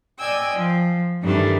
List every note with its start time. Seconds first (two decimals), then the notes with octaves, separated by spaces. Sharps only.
0.18 D5 D#5 G5 G#5 E6
0.54 F3
1.22 G2 D#3 E3 G3 A3 D4